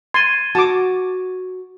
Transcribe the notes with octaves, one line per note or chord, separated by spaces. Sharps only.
C6 G#6 A6 D#7
F#4 A5 D6